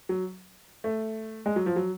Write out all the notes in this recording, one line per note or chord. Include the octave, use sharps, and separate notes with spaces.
F#3
A3
G#3
F#3
F3
F#3